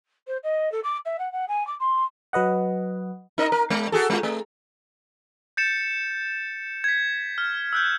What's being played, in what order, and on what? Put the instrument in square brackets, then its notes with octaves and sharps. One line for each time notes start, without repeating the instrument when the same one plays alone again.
[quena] C5
D#5
A4
D6
E5
F#5
F#5
G#5
D6
C6
[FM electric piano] F#3 B4 D#5 F#5
[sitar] D#4 A#4 D#5
A#4
G#3
F#4 G#4 A4
G#3 F4
A3
[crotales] G6 A6 C#7 E7
G#6 B6
F6
E6 F#6 G6